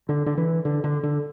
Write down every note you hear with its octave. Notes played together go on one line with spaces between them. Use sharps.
D3
D3
E3
D3
D3
D3